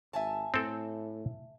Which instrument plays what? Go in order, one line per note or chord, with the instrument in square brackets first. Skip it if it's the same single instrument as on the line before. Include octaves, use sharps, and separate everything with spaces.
[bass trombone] G#1 [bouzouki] E5 G#5 A5
[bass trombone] A2 [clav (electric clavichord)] C4 A4